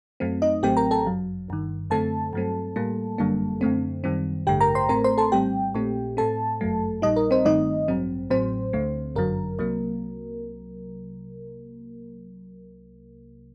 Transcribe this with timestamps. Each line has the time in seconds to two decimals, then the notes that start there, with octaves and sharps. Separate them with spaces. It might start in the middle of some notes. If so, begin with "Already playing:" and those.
0.20 F#2 F#3 A3 C4
0.42 D#4 D#5
0.63 A1 A2 F#3 A3 C4 G4 G5
0.77 A#4 A#5
0.91 A4 A5
1.05 G1 F#2 F#3
1.48 G1 G2 D#3
1.90 F#2 D3 A3 C4 A4 A5
2.33 G2 F#3 A3 C4
2.76 A2 G3 A#3
3.18 G1 F#2 D3 G3 A#3
3.61 F#2 D3 A3 C4
4.04 F#2 D#3 G3 C4
4.47 A1 G2 D3 A3 G4 G5
4.61 A#4 A#5
4.75 C5 C6
4.89 A1 A2 A3 C4 A#4 A#5
5.04 C5 C6
5.18 A4 A5
5.32 A#1 A2 G3 C4 G4 G5
5.74 A#1 A#2 A3 C4
6.17 A2 A3 C4 A4 A5
6.61 G1 F#2 F#3 A3
7.02 A#1 A#2 G3 D#4 D#5
7.16 A#4
7.31 C4 C5
7.45 G1 G2 D#3 A3 C4 D#4 D#5
7.88 A1 G2 F#3 C4
8.30 A1 A2 F#3 C4 C5
8.73 D2 D3 A3
9.16 G1 F#2 D3 F#3 A#4
9.59 C2 C3 F#3 A#3